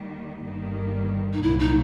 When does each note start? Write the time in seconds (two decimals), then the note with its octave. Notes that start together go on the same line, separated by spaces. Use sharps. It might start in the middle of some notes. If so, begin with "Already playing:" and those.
Already playing: D#2 D#3 G3
0.43 G1 G2 D#3 G3 A#3
1.33 D#4
1.43 C2 A#2 F#3 E4
1.59 D#4